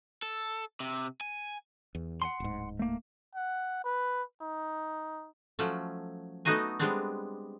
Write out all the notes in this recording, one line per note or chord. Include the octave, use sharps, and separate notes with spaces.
A4
C3
G#5
E2
F#5 G#5 C6
D1 G#2
A3 A#3
F#5
B4
D#4
F3 F#3 A3 C#4
A3 B3 D#4 F#4 D#5 G#5
G3 G#3 B3 C4 D4